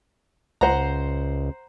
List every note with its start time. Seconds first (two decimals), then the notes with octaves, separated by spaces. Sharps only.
0.61 C#2 C5 F#5 A#5